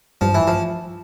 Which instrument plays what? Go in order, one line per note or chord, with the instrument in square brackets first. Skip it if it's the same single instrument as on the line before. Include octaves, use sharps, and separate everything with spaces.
[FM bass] G2 [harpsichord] F3
[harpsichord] E3
F3